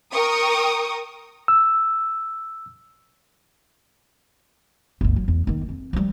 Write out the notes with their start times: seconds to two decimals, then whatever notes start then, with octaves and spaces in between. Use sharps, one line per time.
0.12 A#4 G5 C#6 D#6
1.48 E6
5.01 G1 D2
5.16 F#3
5.28 E2
5.47 D#2 D#3
5.69 F2
5.93 F3 G3